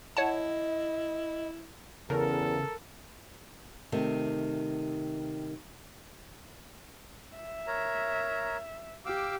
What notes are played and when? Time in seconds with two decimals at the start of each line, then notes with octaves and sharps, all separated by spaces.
0.17 E4 C#5 D#5 F#5 A5
2.10 E2 C#3 A4 A#4
3.92 C3 D#3 A3
7.36 E5
7.67 A#4 C#5 A#5
9.05 G4 F5 D6 E6